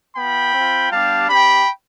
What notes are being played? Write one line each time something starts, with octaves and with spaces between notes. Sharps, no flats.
B3 F4 G5 B5
C4 F4
G3 B3 D4 G4 F5 A5
C4 G4 G5 B5